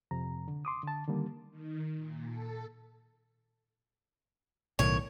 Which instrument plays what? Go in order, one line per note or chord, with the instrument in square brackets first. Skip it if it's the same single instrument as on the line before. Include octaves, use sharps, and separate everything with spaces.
[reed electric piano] F2 C3 A#5
D3
C6 D6 D#6
D3 A5
D3 D#3 G3 A#3
[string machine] D#3
A#2
A4
[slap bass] B1 A2 D#3 [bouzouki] C#5